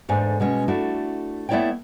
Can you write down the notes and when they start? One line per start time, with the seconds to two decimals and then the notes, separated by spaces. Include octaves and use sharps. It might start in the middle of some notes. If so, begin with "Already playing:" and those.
0.08 E2 G#2 A3 D4 G#5
0.40 B2 G#3 C#4
0.68 A3 D4 E4 F#4
1.49 A3 B3 E4 C#5 D5 G5